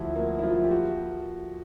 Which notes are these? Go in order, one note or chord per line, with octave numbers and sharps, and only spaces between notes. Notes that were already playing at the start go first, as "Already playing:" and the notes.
Already playing: D2 F3 E4 F#4
A#3
E4
F3 F4
G4
F#4